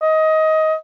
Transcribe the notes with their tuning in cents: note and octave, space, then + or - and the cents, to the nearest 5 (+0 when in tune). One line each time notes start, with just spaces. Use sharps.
D#5 +20